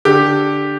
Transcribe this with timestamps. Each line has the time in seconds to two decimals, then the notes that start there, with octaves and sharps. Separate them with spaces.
0.05 D3 G4